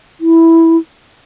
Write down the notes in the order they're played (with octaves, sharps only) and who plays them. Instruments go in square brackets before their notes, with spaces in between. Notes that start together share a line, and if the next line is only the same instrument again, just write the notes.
[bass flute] E4